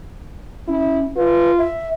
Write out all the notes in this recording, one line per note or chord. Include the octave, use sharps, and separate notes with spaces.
C#4 E4
F4 B4
E5